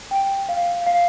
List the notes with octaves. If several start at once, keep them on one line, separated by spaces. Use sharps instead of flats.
G5
F5
F5